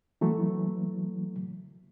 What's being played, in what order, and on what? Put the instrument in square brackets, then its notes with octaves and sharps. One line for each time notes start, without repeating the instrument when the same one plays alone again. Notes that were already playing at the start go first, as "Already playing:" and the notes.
[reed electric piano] E3 F#3 A3 A#3